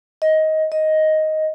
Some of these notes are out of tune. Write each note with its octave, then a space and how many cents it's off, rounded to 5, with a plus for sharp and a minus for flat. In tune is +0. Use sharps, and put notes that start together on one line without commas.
D#5 +15
D#5 +5